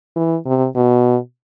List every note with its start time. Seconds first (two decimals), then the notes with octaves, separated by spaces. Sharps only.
0.16 E3
0.46 C3
0.76 B2